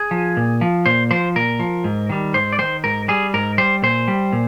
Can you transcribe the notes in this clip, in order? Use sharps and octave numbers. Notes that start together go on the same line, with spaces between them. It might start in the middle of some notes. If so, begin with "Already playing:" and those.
Already playing: G#4
F3
A#2
F3
A#2 C5
F3 C5
A#2 A#4
F3
G#2
D#3 G3
G#2 C5
D5
D#3 G3 C5
G#2 A#4
G3 G#4
G#2 A#4
G3 C5
A#2 C5
G3
A#2